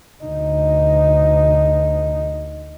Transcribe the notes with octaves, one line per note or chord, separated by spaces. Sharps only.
D2 D#4